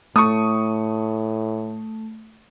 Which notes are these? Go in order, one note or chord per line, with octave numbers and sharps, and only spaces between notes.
A2 A3 C#6 D#6